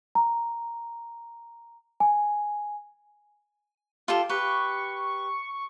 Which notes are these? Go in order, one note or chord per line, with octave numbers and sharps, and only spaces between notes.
A#5
G#5
F4 G4 A4
G4 B4 C#6